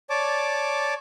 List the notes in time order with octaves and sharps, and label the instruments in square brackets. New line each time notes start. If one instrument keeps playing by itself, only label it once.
[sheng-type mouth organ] C#5 D5 A5 D6